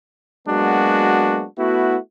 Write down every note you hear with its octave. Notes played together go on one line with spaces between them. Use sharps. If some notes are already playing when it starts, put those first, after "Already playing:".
F#3 G#3 A#3 B3 D4 F#4
A3 B3 E4 F#4